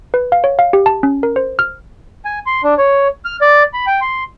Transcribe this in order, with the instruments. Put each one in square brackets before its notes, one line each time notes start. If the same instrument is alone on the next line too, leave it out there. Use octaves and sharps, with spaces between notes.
[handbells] B4
F5
C#5
F5
G4
A5
C#4
A#4
C5
F6
[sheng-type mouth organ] G#5
C6
D4
C#5
F6
D5
B5
G5
C6